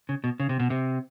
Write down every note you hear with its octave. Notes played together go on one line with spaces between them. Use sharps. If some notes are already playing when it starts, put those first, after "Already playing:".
C#3
B2
C#3
C3
B2
C3